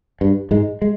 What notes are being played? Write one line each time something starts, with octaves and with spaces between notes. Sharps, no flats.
G2
G#2 G#3
G#3